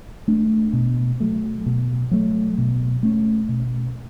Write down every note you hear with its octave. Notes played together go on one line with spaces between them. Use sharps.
A3 D4
B2
F#3 A3
B2
F#3 A3
B2
A3 C#4
B2